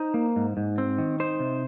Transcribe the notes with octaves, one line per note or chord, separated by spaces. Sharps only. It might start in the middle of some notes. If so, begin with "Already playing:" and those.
Already playing: D#4 C5
A#3
G#2
G#2
C4
D#3
D#4 C5
C3